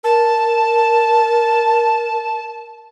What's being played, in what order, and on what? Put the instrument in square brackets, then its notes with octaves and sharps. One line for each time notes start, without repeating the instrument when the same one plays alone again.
[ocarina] A#4 [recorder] A5